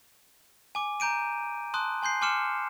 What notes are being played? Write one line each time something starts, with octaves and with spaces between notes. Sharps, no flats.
G#5 D6
A#5 G6 D7 D#7
A5 C6 D#6 F#6
G#5 C6 G6 C7
G#5 C6 D6 F6 C#7 E7